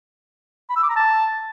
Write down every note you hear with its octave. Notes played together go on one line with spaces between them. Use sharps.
B5
E6
D6
A#5
A5